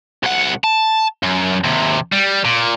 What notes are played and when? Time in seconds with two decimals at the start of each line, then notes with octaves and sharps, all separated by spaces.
0.23 C2 F#5
0.64 A5
1.23 F#2
1.64 D#2 C3
2.12 G3
2.45 A#2